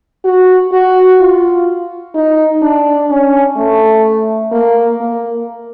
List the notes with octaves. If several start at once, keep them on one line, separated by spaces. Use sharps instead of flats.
F#4
F#4
F4
D#4
D4
C#4
A3
A#3
A#3